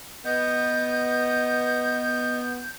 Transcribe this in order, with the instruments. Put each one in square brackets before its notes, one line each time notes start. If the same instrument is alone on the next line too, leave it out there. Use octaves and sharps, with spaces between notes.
[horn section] B3 [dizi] D#5 [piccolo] G6